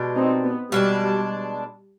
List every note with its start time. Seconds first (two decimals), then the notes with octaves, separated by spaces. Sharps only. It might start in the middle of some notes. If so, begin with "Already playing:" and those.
Already playing: B2 G#3 D4 G4
0.16 C4 D#4
0.44 B3
0.72 B2 G3 G#3 D4